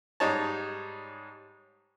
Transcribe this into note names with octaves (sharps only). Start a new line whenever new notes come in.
G#2 G3 D#4 C#5 A5